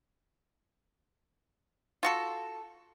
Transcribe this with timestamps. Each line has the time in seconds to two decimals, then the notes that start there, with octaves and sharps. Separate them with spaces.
2.03 F4 F#4 A4